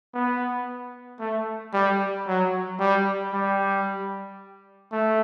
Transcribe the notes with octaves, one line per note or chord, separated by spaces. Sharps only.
B3
A3
G3
F#3
G3
G3
A3